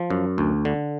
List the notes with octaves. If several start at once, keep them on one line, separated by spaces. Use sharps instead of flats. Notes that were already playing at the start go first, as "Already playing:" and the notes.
Already playing: F3
F#2
D2
D3